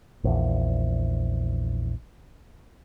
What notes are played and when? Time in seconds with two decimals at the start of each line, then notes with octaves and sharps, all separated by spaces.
0.24 A#1 E2